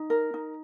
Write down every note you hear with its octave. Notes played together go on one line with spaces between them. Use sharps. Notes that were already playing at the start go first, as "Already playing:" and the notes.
Already playing: D#4
A#4
D#4